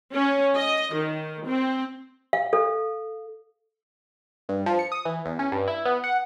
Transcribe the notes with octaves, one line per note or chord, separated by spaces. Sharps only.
C#4
D#5
D#3
C4
F5
A4
G2
F3
C#7
D#6
E3
E2
C#4
G2
E4
B3
F#5